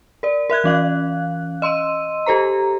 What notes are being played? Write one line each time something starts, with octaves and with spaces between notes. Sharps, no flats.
A#4 D5
A#4 E5 F#6 G#6
E3 C#4 F5 F#6
D#5 C6 E6 D#7
G4 A4 C5 A#5